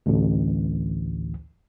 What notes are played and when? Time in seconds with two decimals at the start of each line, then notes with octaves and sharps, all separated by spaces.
0.06 A1 D2